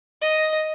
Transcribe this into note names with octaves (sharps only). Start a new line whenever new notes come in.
D#5